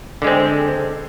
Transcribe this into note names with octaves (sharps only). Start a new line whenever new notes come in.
D3 G#3 C4